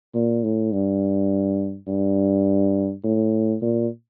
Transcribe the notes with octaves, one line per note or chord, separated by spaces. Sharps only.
A#2
A2
G2
G2
A2
A#2